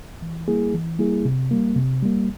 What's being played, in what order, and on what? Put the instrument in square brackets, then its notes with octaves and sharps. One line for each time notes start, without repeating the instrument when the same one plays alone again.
[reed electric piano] E3
G3 A#3 E4 G#4
E3
G3 A#3 E4 G#4
C3
G3 A#3
C3
G3 A#3